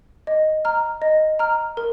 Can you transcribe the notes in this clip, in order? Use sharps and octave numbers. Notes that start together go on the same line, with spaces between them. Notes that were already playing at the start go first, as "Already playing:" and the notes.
D#5
A#5 F6
D#5
A#5 F6
A#4